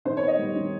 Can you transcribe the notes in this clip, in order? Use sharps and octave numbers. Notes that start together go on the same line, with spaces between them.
D#3 C5
C#5
B3
D#5
G3
D#3